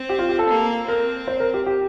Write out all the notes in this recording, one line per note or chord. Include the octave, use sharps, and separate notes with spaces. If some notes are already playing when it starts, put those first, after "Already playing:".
Already playing: C4
G4
F4
G4
A4
A#3
C4 A#4
C5
A#4
G4
G4